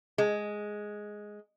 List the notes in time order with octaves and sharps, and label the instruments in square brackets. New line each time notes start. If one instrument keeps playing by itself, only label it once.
[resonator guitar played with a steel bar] G#3